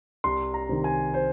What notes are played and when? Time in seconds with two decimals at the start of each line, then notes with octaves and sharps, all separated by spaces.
0.24 C2 C6
0.54 A#5
0.69 C3 D#3
0.84 G#5
1.14 C5